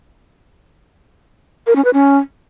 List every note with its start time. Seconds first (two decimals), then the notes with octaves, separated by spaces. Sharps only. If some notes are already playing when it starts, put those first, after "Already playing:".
1.67 A#4
1.76 C#4
1.85 B4
1.93 C#4